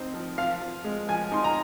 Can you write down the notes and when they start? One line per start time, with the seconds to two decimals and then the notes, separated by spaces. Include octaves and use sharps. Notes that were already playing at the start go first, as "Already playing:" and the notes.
Already playing: F3 C4 D#4
0.14 F3
0.38 F3 F5
0.61 F3
0.84 G#3
1.08 F3 G#5
1.32 D#4 C6
1.44 A#5